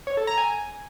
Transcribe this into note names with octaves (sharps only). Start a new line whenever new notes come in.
C#5
A4
A#5
G#5